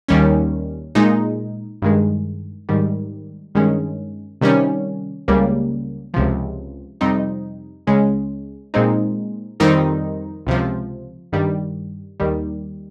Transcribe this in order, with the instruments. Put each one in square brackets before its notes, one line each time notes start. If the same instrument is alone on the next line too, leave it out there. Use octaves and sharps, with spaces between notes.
[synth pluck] D#2 D#3 G3 C#4
A#2 G#3 D#4
G2 D#3 G#3
G#2 D#3 G3
G2 D#3 G#3 C#4
C3 D#3 G3 C#4
C#2 C#3 G3 A#3
C#2 C3 F3
F2 C3 G3 C4 D#4
C#2 C#3 G#3 C#4
A#2 G#3 C4 D#4
F2 D#3 G3 C4 D#4
C#2 C3 F3
G2 D#3 G3
D#2 D#3 G3